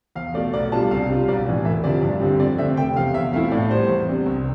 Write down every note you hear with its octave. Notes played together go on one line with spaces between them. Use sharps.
E2 F5
B2 A3 D5
B1 D5
B2 G3 D4 F4 A5
C2 F5
C3 G3 D4 F4
B1 D5
A2 E3
E1 E5
D2 C3 F3 D5
G2
D3 G3 C4
F2 D5
D3 A3 C4 E5
F1 G5
E2 C3 F5
E2 E5
B2 A3 C4 E4 F5
A2 D5
G3 B3 C5
E2
C3 G3 D4
C2